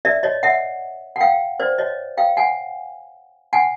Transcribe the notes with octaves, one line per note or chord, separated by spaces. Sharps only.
D5 E5
C#5 D#5
E5 F#5
F#5
F5 G5
C5 D5
C#5 D#5
F5 G5
F#5 G#5
F#5 G#5